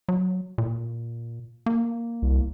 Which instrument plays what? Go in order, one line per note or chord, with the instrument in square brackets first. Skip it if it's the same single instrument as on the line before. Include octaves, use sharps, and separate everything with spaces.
[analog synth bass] F#3
A#2
A#3
[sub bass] C2